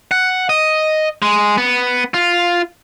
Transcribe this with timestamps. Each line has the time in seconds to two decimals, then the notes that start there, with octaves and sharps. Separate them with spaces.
0.11 F#5
0.49 D#5
1.22 G#3
1.58 B3
2.14 F4